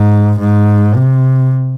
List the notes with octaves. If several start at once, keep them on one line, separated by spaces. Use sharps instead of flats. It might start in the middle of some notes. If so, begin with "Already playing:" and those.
Already playing: G#2
G#2
C3